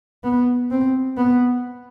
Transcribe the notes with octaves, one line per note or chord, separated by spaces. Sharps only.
B3
C4
B3